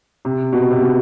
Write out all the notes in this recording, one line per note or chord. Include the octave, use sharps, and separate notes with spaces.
C3
B2
C3
B2